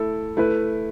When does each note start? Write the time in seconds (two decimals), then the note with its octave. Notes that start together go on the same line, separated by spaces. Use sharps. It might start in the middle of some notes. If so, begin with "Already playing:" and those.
Already playing: A3 E4 A4
0.37 A3 E4 B4